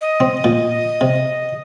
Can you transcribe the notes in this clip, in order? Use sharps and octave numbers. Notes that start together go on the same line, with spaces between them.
D#5
C4
A#2
C3